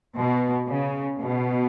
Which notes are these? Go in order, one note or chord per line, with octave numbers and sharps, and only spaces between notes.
B2
C#3
B2